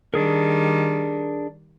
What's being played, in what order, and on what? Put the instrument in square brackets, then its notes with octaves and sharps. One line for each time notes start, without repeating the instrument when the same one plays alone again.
[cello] D#3 G3 [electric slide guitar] D4 G#4 A#4